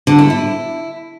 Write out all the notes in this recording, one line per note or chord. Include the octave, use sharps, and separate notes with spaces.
D3
E4
E4